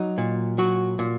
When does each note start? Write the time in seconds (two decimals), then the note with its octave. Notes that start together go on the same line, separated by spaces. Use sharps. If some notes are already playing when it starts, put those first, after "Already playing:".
Already playing: F#3 D#4
0.18 A#2
0.58 F#3 F#4
0.99 A#2